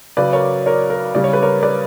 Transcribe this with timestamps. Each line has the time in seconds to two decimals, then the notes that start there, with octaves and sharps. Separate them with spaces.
0.17 C#3 F#3 B4 D5
0.33 A#4 C#5
0.66 A#4 C#5
0.90 A#4
1.15 C#3 G3 D5
1.24 C#5
1.33 B4
1.43 A#4 C#5
1.63 B4 D5